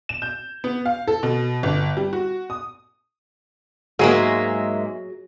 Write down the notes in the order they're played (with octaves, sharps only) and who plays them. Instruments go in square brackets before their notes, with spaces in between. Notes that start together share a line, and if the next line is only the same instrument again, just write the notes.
[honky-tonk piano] E7
G6
B3
F5
A4
B2
G1
G3
F#4
D#6
[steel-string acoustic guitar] G#2 G#3 A#3 [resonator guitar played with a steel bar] F#3 G#4 [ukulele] F#4 A#4 [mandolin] E5